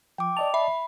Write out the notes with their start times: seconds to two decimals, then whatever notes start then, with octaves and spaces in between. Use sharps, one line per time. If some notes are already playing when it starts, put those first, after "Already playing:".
0.18 F3 G5 D6
0.37 D5 D#5 A5 F7
0.54 E5 B5